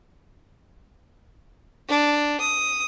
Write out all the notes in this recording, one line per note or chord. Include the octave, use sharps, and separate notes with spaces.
D4
D#6